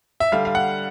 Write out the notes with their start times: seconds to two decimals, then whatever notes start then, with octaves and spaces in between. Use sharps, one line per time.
0.20 E5
0.32 D3 G3 F5
0.45 F5
0.55 F#5